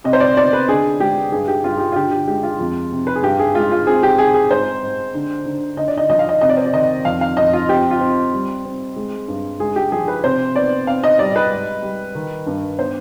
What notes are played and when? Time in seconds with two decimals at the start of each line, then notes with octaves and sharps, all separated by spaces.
0.04 C3 D#5
0.13 C5
0.20 D5
0.36 B3 D5
0.53 B4
0.68 D3 G#4
1.00 G#3 G4
1.32 G2 G#4
1.48 G4
1.63 G2 F4
1.76 G#4
1.80 G4
1.92 F4
1.96 D3 G4
2.11 G4
2.27 G#3 G4
2.43 F4
2.59 F2
2.92 C3
3.07 B4
3.16 G#4
3.23 G2 G4
3.39 G#4
3.55 G#3 F4
3.71 F4
3.87 C4 G#4
4.03 G4
4.18 C4 G#4
4.34 G#4
4.51 G#2 C5
4.82 G#2
5.14 D3
5.46 D3
5.77 D3 D#5
5.88 D5
5.98 D#5
6.10 F3 D#5
6.19 F5
6.29 D#5
6.41 C3 D#5
6.49 D5
6.57 C5
6.66 D5
6.73 D#3 D#5
7.05 F2 F5
7.21 F5
7.37 F2 D#5
7.53 F4
7.69 C4 G4
7.91 F4
8.01 C4
8.33 G3
8.65 C4
8.96 G#3
9.28 G2
9.60 G#3 G#4
9.76 G4
9.91 F3 G#4
10.08 B4
10.24 C3 C5
10.56 B3 D5
10.87 C4 F5
11.04 D#5
11.19 G3 D5
11.36 B4
11.51 G#2
11.82 G3
12.15 D#3
12.47 G2
12.79 B3 C5